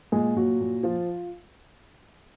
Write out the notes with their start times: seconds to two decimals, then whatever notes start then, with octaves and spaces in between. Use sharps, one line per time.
0.12 A#2 G#3 G#4
0.36 A#2 F#3 F#4
0.61 A#2
0.83 F3 F4